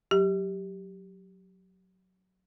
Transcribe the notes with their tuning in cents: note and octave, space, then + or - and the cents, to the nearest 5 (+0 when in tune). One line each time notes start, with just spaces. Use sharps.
F#3 +0 G4 +0